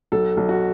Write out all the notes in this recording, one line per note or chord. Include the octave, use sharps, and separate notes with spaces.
B1 A4
B1
F#4